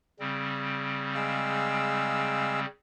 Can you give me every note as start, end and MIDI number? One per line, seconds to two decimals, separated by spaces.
0.20 2.66 49
0.20 2.66 55
0.20 2.66 60
1.15 2.60 56
1.15 2.60 77
1.15 2.60 88